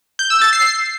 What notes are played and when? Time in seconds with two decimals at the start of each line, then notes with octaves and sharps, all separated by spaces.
0.19 G6
0.30 E6
0.42 A6
0.53 C7